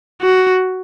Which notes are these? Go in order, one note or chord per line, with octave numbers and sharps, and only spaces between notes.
F#4